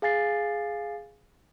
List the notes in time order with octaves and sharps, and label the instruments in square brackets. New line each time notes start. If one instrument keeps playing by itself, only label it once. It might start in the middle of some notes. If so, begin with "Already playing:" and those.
[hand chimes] G#4 F5 G#5 A6 C7